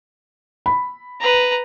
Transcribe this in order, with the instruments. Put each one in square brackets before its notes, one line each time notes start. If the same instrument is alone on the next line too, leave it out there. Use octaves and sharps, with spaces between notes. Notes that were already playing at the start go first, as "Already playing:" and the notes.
[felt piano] B5
[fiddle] B4 A#5